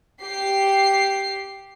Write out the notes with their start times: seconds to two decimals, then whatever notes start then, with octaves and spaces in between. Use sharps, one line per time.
0.22 G4 C7